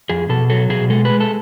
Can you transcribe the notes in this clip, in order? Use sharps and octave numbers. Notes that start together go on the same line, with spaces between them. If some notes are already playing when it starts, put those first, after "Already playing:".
F2 G#4
B2 A4
F#3 A4
B2 G#4
G#3 A4
G#3 B4
A4